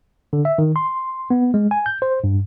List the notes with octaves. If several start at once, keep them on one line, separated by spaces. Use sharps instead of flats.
D3
E5
D#3
C6
B3
G#3
G#5
G6
C5
G2